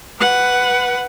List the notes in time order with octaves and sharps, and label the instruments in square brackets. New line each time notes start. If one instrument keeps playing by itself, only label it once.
[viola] B4 F#5